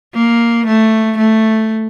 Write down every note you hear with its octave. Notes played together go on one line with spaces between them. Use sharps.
A#3
A3
A3